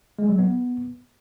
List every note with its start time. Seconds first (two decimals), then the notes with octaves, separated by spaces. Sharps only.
0.19 G#3
0.28 F#3
0.38 B3